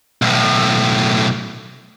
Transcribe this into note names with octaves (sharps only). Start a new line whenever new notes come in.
B1 A2